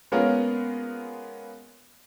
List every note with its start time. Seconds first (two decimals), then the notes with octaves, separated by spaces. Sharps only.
0.12 G#3 A#3 B3 C#4 F4 A#4